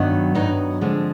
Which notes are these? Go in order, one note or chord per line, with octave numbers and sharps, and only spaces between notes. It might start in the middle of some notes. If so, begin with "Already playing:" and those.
Already playing: G2 D#3 F#3 B3
G2 D#3 F#3 B3 D#4
D3 F3 G#3 C4